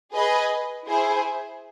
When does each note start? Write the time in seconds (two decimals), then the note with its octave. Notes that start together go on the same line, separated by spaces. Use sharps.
0.13 G#4 B4 D#5
0.87 E4 G#4 C5